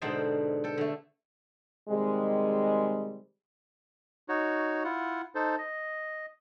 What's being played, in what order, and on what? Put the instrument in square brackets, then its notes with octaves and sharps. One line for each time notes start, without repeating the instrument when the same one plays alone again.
[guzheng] G#2 B2 D3 C5 G5 A5
A4 G5
D3 A3
[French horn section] C3 D#3 G3 G#3
[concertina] D#4 F#4 C#5
E4 F4 F#5
D#4 A4 C5
D#5